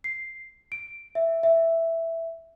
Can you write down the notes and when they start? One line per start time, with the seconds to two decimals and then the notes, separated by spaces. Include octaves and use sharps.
0.04 C7
0.72 D7
1.15 E5
1.43 E5